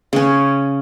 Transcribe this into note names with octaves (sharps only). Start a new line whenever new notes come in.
C#3 C#4